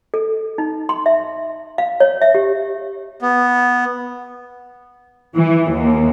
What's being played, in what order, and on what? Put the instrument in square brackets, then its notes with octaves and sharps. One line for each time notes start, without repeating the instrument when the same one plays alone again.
[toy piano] A4
D#4
C6
E5
F5
C#5
E5
G4
[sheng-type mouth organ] B3
[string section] E3
D#2